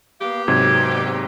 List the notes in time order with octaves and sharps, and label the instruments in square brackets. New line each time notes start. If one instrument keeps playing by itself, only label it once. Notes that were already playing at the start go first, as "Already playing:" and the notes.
[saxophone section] A#3 B3 G4 [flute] F5
[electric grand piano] G#2 C3 F#3 [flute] G#6
[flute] D5